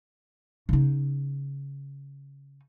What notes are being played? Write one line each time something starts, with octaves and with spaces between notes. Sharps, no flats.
C#3 D#4